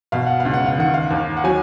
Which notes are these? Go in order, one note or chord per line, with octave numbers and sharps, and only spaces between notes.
B2 F5
F#5
C#2 F5
F#5
F5
D#3 F#5
F5
D#2
F#5
F#3 G#5